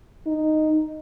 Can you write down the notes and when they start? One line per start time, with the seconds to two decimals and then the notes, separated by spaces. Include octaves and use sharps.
0.27 D#4